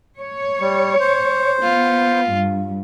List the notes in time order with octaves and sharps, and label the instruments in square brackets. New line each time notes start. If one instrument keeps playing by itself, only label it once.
[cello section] C#5
[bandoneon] G3
C5
[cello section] B3 [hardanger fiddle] F4
[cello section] G2